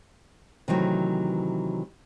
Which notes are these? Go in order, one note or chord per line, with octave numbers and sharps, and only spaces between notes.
C3 D#3 E3 F#3 A3